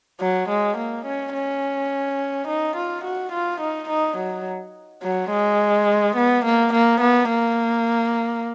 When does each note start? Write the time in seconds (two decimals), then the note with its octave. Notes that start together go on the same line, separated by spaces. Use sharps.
0.20 F#3
0.50 G#3
0.77 A#3
1.06 C#4
1.34 C#4
2.47 D#4
2.76 F4
3.04 F#4
3.32 F4
3.61 D#4
3.89 D#4
4.17 F#3
5.03 F#3
5.30 G#3
6.16 B3
6.45 A#3
6.73 A#3
7.01 B3
7.29 A#3